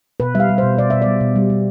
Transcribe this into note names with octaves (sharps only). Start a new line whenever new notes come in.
B2 B4
G3 E5 F5
G3
B2 C5
B2 D5
B2 E5
G3 D5
B2
G3
G3